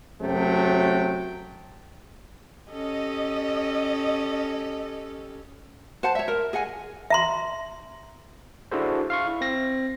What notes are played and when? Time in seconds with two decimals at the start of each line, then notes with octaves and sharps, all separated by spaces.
0.22 F#2 C3 F#3 A3 G5
2.70 C#4 G4 A4 D#5
6.03 C5 F#5 A5
6.15 C#5 E5
6.28 A#4
6.53 G#4 D#5 F#5 G#5
7.10 E5 A#5 C6
8.72 D4 E4 F#4 G#4 A4 C5
9.10 F5 C6 C#6
9.27 E4
9.41 C4 A#6